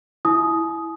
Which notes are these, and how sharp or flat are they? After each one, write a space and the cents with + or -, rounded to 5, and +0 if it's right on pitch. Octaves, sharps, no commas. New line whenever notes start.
E4 +0 G#5 +40 D#6 +0